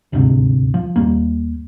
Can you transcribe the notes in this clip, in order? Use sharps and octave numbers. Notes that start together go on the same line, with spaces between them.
D#1 D2 G#2 C3
F3
D#2 G3 A#3